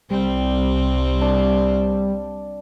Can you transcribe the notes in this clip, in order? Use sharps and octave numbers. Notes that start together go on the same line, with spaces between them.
C2 G3 C4
D4